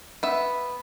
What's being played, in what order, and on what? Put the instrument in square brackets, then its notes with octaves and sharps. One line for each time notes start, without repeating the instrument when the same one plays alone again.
[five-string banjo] B3 E5